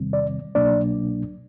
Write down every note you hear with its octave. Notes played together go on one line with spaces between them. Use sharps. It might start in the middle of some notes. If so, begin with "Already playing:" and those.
Already playing: E2 C3 D#3 G3 C4
D5
C2 B2 F#3 A#3 D4 D5